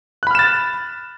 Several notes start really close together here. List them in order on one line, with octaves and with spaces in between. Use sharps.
F#6 B5 F6 E7 A6